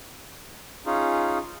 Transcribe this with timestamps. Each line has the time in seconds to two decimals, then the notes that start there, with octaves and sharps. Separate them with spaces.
0.86 C#4 D#4 F4 G#4